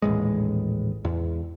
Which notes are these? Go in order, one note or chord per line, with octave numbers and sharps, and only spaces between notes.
D#1 A1 G#3
E2